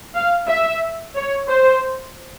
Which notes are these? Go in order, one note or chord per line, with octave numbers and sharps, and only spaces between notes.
F5
E5
C#5
C5